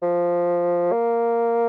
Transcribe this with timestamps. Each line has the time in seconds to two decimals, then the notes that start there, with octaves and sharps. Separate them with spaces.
0.02 F3
0.92 A#3